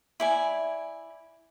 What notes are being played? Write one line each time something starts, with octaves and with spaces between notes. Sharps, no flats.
E4 D5 G#5